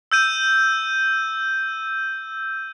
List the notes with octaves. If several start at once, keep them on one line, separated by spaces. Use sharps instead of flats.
E6 G6 D#7